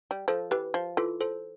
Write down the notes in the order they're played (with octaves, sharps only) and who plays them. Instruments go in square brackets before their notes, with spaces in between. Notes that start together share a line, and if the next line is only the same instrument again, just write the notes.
[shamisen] G3
[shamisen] F3 [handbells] A4 C5
[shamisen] E3 [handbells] G4 B4
[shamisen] F3
[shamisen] E3 [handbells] F4 A4
[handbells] A4 C5